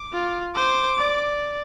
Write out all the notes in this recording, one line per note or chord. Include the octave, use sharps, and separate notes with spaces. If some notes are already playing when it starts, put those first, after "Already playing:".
Already playing: D6
F4
C5 D6
D5